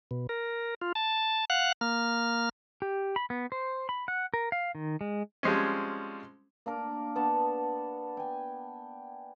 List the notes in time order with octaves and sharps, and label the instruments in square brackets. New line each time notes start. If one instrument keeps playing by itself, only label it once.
[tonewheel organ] B2
A#4
F4
A5
F5 F#5 F#6
A#3 F6
[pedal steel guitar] G4
B5
B3
C5
B5
F#5
A#4
F5
D#3
G#3
[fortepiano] F3 G3 G#3 C4 C#4
[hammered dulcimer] A#3 D4 A#4
B3 D4 F#5 A5
G5 G#5